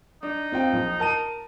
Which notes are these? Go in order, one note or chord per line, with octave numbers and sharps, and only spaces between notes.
D4 D#4
C4 F4 G5
A#1
A#4 A5 D#7